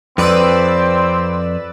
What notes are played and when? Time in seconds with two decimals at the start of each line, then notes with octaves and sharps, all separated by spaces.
0.18 F2 C4 B4 D5 E6